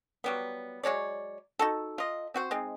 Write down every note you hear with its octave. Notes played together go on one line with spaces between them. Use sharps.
F#3 G3 B3
F#3 G#3 C#5 D5
D#4 F#4 A4
F4 D#5
C4 F#4 C5
G#3 C4 D#4